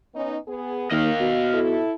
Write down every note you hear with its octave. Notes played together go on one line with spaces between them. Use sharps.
B3 C#4 D#4
B3 G#4
D#2 D#3 D#5 F5
B2
E4 A4